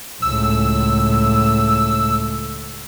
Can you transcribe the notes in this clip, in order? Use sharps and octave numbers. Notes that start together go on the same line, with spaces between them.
C#2 A2 E6